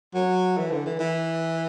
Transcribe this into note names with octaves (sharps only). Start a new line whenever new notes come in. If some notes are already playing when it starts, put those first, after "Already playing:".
F#3
E3
D3
E3
E3